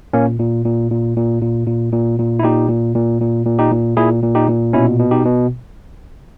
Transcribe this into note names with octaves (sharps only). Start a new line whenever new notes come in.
A#2 A#3 C#4
A#2
A#2
A#2
A#2
A#2
A#2
A#2
A#2
E4
A#2 D#4 G4
A#2
A#2
A#2
A#2
D#4 G4
A#2
A#2 E4 G#4
A#2
D#4 G4
A#2
B2 C#4 E4
B2
D#4 G4
B2